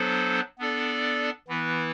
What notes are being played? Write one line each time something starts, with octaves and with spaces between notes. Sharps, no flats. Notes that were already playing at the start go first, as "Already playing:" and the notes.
Already playing: F#3 B3 D4 A4 C5
B3 D4 A4 D5
E3 B3 E4 B4